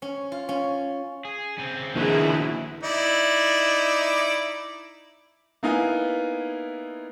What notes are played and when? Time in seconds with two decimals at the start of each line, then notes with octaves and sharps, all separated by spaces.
0.02 C#4
0.32 F4
0.49 C#4
1.25 G#4
1.58 C#3 C4
1.95 A#1 D#3 E4 F#4 G#4 B4
2.83 D#4 E4 D5
5.63 A#3 B3 D#4 E4 F5 G#5